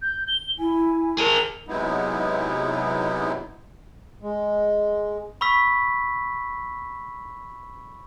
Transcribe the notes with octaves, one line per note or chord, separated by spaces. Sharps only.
G6
G7
E4 G#5
G#4 A#4 F7
C3 F#3 G#3 B3 D#4 E4
G#3
B5 C#6 E6 B6